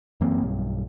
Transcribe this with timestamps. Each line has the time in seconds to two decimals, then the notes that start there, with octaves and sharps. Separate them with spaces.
0.21 F#2 E3 A#3 C4
0.43 B1 G2